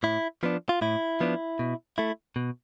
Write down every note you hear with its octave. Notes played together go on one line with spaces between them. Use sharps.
A2 E4
F3 B3 D4
F4
A2 E4
F3 B3 D4
B2
A3 E4
B2